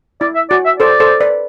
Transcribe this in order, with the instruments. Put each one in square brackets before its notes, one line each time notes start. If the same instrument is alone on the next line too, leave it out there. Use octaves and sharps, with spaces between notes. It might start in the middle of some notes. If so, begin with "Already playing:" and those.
[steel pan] E4 [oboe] D5
[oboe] E5
[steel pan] F#4 [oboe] D5
[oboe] E5
[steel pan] A4 C5 [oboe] D5
[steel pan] A4 C5
B4 D5